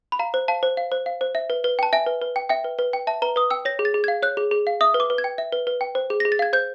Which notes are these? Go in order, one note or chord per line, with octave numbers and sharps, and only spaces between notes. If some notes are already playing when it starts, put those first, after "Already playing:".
B5
F5 A#5
C5
F5 A5
C5
F5
C5
F5
C5
E5
B4
B4
G5 A5
E5 G#5
B4
B4
G5
E5 G5
B4
B4
G5
E5 A5
B4 A#5
B4 D#6
G5 E6
C#5 A#6
G#4
A6
G#4
F5 G#6
C#5 F#6
G#4
G#4
F5
E5 D#6
B4
D6
B4
G#6
G5
E5
B4
B4
G5
C5
G#4
G#4 A#6
A6
F5 G#6
C5 G6